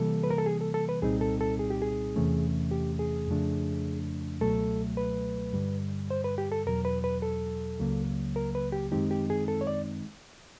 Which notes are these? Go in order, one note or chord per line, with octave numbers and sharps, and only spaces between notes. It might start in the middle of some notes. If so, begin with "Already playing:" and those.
Already playing: C3 E3 G3 A#3 A4
B4
A#4
A4
G#4
A4
A4
B4
C2 A#2 G3 C4 D#4 G#4
A4
A4
G#4
G4
G#4
E2 C3 E3 A3 C#4
G4
G#4
F2 C#3 F3 A3 D4
C#2 B2 F#3 A3 A4
B4
G2 D3 G3
C5
B4
G4
A4
E2 B2 F#3 A#4
B4
B4
A4
C#2 C#3 F#3 A#3
A#4
B4
G4
F#2 D#3 G#3 C4 D#4 G4
G4
G#4
A4
C#5
D5